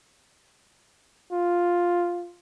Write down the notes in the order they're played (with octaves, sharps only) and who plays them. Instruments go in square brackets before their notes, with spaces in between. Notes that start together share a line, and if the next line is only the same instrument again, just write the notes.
[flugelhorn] F4